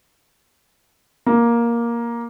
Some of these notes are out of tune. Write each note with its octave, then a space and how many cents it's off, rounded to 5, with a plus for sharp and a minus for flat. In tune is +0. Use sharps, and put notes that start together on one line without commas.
A#3 +10